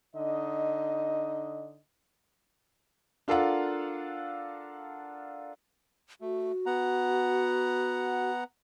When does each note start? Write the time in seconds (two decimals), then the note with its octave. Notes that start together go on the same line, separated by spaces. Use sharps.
0.15 D3 D#4 D#5
3.28 D4 F4 A4 A#4 F5 F#5
6.21 A3 F#4
6.66 B3 F#5 A#5